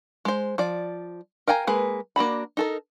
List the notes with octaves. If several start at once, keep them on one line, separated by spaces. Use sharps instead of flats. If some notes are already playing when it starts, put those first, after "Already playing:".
G#3 C5
F3 D5
A#4 F5 G5 G#5 A#5
G#3 A#3 G#4 B4
A#3 D4 F#4 B5
D#4 A4 A#4